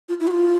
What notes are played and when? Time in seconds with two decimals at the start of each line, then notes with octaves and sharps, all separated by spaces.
0.09 F4
0.20 E4
0.27 F#4
0.31 F4